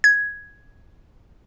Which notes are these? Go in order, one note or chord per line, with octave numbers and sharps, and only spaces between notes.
G#6